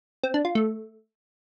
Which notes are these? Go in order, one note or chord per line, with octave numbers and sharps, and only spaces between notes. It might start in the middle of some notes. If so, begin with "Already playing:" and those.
C4
D4
F4
A3